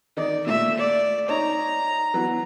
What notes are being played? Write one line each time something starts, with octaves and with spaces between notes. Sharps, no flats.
D#3 D#4 D5
A#2 A3 E5
D5
D#4 C#5 A#5
E3 F#3 B3